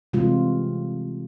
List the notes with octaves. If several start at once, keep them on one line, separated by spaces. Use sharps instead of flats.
C3 E3 G3 G#3 F4